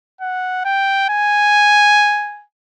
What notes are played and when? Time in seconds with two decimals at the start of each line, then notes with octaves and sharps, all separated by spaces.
0.21 F#5
0.65 G5
1.10 G#5